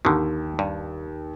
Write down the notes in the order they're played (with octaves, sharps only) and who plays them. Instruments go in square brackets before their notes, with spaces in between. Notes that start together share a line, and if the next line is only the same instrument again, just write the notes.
[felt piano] D#2 [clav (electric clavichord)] D3 D#3
[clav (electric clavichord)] G2